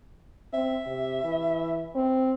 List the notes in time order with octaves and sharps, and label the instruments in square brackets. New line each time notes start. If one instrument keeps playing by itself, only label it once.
[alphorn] C4 [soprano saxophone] E5
[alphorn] C3
E3
C4